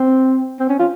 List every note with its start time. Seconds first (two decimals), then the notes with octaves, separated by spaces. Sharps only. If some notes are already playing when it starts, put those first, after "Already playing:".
Already playing: C4
0.59 C4
0.69 C#4
0.79 F4